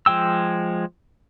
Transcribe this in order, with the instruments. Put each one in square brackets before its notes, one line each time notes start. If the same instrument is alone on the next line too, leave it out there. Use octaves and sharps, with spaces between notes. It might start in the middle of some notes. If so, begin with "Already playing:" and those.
[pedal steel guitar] F3 G#3 G5 E6